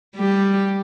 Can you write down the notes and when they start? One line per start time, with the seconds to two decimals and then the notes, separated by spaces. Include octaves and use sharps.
0.16 G3 G4